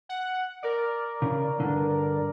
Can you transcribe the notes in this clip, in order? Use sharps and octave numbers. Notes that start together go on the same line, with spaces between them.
F#5
A#4 D5
C#3
G2 D3